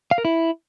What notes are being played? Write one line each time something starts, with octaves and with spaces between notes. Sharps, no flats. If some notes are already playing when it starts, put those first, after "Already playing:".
F5
A#4
E4